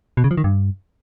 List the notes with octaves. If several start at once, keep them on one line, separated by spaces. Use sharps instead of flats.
B2
C#3
F3
D#3
G2